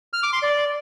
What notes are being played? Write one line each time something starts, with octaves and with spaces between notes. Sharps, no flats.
F6
D6
C6
D5